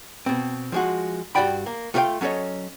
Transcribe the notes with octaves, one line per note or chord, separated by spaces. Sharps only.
B2 C4
F3 G#3 F#4
G2 C#3 F#4 D5 G5 B5
A#3
A3 F4 F#4 C#5 F5 G5
F#3 C#4 A4 C#5 D#5